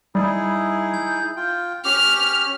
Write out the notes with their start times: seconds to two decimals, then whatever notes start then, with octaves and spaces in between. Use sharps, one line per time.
0.15 G3 D#4 E4 G#4
0.94 G6
1.36 F4 G5
1.85 C#4 G4 D6 F6